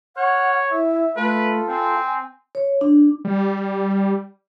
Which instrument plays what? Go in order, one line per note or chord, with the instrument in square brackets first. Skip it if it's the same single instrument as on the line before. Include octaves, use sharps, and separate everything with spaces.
[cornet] C#5 [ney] F#5 [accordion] F6 F#6
[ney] E4 [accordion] E5
[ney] A3 [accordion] F4 A4 [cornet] B4
[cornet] C4 [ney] G#5
[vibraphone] C#5
D4
[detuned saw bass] G3